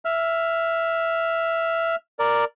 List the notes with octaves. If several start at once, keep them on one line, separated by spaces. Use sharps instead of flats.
E5 F6
A#4 D5